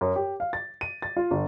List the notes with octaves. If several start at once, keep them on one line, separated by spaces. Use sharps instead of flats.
F#2
G4
F5
A6
D#7
A6
F4
G1